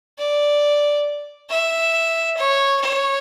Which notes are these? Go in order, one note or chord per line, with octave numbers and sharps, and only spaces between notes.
D5
E5
C#5
C#5